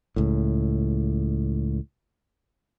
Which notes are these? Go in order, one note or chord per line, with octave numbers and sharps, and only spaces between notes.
C#2 A2